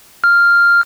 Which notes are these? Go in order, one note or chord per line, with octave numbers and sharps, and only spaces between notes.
F6